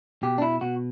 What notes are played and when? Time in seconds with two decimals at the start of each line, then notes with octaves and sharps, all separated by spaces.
0.23 B2 G4
0.38 D4
0.42 E4
0.61 B2 F#4